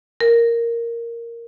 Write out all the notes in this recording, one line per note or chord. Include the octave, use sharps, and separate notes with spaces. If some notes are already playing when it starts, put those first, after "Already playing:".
A#4